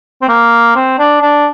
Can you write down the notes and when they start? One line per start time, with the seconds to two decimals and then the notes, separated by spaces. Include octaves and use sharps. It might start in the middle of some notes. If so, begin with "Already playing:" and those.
0.22 C4
0.28 A#3
0.76 C4
0.99 D4
1.22 D4